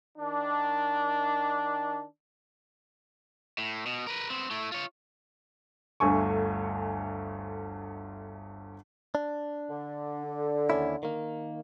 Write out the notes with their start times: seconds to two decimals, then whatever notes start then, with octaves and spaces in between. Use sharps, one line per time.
0.18 D#3 D4
3.58 A2
3.86 B2
4.07 A#4 B4
4.30 B3 C4
4.50 A3 E4
4.72 F4 C#5
6.00 G1 D2 A3 G#5 C#6
9.15 D4
9.70 D3
10.70 D#2 C#4 E4
11.03 D#3 A#3